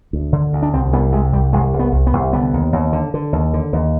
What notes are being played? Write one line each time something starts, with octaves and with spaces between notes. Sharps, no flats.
D2
D3
D2
D4
C2 C4
C2 B3
C3 G#3
C2 G3
C2 G#3
C2
B3
C2
B3
C2
D3 B3
D#2
D#2
D3
D3
D#2
D3
D#2